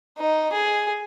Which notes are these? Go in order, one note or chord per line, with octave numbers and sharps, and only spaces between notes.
D#4
G#4